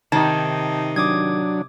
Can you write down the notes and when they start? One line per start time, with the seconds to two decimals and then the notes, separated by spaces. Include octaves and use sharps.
0.12 C3 D#3 D#4 A5 G#6
0.96 F#3 D4 D6 D#6 G#6